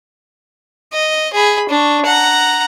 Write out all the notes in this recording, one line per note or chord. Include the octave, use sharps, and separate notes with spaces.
D#5
G#4 B5
D4 C#6
F#5 A#5